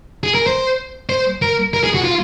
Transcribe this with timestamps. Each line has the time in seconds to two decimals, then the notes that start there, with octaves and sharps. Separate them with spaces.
0.23 G#4
0.35 A#4
0.47 C5
1.09 C5
1.42 A#4
1.74 A#4
1.84 G#4
1.94 F#4
2.04 F4